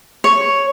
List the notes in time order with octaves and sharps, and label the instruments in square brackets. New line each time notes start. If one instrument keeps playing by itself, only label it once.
[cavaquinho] C#5